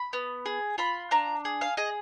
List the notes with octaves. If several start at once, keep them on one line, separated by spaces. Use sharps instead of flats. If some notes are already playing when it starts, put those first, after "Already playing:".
Already playing: B5
B3
G#4
F4 B5
D4 A#5
G#4
F5
G#4 D#5